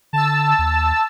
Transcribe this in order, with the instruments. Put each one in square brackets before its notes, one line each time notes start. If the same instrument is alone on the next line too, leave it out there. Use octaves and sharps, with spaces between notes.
[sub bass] D3 [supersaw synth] A5 E6
[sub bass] D#2